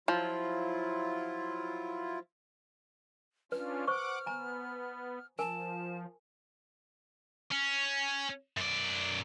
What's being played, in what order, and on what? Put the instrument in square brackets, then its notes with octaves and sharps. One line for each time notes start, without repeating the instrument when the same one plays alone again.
[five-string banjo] F3 [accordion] F#3 E4 F4
[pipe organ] C#4 D4 F4 [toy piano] B4 [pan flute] F6
[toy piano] C5 C#6 [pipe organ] F#5 D6
[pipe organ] B3 [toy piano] G#5 A#5
[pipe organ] F3 [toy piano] A#4 G#5 [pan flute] A5
[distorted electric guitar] C#4
F#2 D5